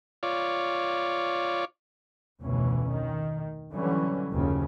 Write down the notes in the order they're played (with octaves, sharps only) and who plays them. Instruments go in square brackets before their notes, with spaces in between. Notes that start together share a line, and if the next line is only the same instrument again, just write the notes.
[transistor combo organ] F4 C#5 D5
[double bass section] F1 D2 B2 E3 C#4
D#3
D3 E3 F#3 G3 C#4
F#1 D#2 C#3 F3